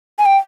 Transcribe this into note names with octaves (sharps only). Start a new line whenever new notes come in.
G#5
G5